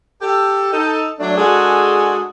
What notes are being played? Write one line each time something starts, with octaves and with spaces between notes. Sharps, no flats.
G4 A4
D#4 A4
F#3 A3 D4
G#3 D4 F#4 G#4 A4